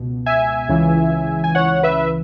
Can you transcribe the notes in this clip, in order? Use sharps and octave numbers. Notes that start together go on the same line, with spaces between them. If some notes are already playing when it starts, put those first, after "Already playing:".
Already playing: C#2 B2
E5 G#5
C#2 C#3 E3
G#5
C#5 F#5
B4 E5